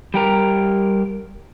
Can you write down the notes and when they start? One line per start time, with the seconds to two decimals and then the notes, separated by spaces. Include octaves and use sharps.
0.14 G3 G4 A#4